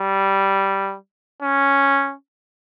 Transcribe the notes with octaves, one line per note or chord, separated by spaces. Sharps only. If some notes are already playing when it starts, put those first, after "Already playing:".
Already playing: G3
C#4